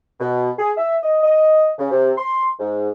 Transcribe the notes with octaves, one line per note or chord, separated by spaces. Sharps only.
B2
G#4
E5
D#5
D#5
C#3
C3
C6
G#2